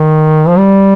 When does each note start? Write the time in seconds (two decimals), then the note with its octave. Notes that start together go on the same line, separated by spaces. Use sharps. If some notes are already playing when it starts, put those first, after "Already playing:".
Already playing: D#3
0.48 F3
0.58 G3